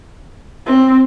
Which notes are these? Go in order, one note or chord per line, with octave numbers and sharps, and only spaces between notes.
C4